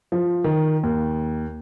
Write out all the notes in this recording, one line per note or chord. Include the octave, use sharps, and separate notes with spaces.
F3
D#3
D#2